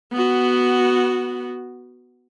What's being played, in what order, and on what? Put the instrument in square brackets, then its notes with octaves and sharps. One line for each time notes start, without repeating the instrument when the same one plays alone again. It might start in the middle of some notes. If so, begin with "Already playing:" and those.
[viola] B3 F#4